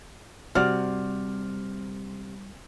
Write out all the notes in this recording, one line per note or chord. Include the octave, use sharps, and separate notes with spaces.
C3 G3 F#4 D5 F6